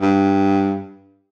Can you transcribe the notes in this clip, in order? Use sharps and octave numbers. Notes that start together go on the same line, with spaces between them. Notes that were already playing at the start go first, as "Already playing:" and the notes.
G2